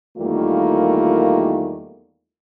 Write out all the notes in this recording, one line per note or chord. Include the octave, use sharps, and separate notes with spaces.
E2 D#3 G3 A3 A#3 F4